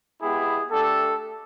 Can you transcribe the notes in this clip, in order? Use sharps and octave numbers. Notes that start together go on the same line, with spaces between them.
G#3 B3 E4 G4 G#4
A3 D4 G4 A4